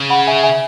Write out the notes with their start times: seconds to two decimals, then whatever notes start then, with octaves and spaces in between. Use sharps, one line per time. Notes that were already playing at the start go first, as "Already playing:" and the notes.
Already playing: C#3
0.10 F#5 B5
0.27 E5 G#5
0.43 E5 G#5